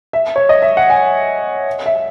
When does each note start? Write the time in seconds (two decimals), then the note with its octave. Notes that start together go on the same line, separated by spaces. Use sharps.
0.13 E5
0.36 C#5
0.49 D#5
0.62 E5
0.77 F#5
0.90 G#5
1.86 E5